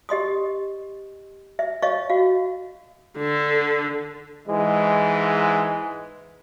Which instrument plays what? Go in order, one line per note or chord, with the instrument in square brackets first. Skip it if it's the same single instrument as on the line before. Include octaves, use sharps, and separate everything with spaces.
[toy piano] G4 D#5 C6 D#6
E5
C#5 D#5 F5 C#6
F#4 F5
[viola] D3 A4
[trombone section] G#2 E3 G#3